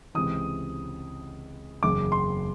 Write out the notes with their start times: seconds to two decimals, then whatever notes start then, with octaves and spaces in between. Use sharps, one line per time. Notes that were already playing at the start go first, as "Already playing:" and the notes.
0.15 C#2 C3 E3 D#6
1.83 F#1 E2 C#3 D6
2.12 C6